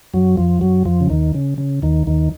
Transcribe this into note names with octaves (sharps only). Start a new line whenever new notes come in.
F#2 F#3
F2 F3
F#2 F#3
F2 F3
C#3
D#2 D#3
C#3
C#3
D#2 D#3
D#2 D#3